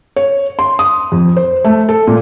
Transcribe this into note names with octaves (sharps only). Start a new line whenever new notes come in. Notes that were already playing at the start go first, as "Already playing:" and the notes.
C#5
C6
D#6
F2
C5
A3
A4
A#2